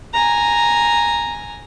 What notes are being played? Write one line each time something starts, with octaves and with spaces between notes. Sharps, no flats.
G#5 A#5